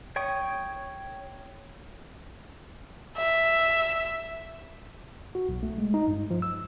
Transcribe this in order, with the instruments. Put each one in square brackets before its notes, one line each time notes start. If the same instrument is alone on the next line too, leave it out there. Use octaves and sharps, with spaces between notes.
[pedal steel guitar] C#5 G5 C#6 D#6
[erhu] E5
[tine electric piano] F#4
B1
A3
G#3
D#4
G2
F3
E6